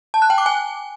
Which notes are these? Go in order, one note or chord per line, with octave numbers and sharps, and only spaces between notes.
A5
F#6
G5
D6
G#5